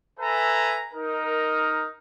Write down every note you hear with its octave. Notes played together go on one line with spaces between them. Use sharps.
A4 B4 E5 G#5 A#5
D#4 A#4